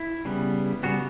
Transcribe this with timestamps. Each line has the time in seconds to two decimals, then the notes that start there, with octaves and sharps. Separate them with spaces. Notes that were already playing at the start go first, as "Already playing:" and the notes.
Already playing: E4
0.25 C#3 G3 B3
0.83 C#3 G3 B3 F#4